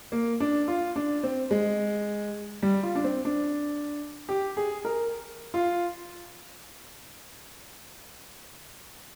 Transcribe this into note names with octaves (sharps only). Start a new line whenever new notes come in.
A#3
D4
F4
D4
C4
G#3
G3
F4
D4
C4
D4
G4
G#4
A#4
F4